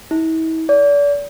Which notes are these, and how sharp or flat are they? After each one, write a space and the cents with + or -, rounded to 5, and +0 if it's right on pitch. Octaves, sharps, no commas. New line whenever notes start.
E4 -40
D5 -35